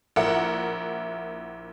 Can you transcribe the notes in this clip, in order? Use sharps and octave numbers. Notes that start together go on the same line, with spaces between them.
A#1 E4 A#4 F#5